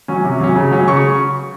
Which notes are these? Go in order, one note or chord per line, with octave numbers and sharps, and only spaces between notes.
F#3 C#4
C3
F#3 C#4
C#3
F#3 C#4
C#3 C#6